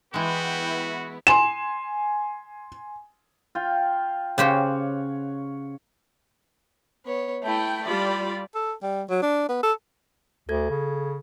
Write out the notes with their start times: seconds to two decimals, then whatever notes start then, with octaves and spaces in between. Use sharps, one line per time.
0.14 E3 G#3 B3 E4 F#4 G5
1.27 G#5 C6 E7
3.55 F4 F5 G5
4.38 C#3 G4 C5 C#5 F5 F#5
7.06 B3 C#5
7.43 A3 E4 G5
7.87 G3 F4 D5 B5
8.55 A4
8.82 G3
9.09 F#3
9.22 D4
9.49 B3
9.63 A4
10.49 D2 A4 G#6
10.70 C#3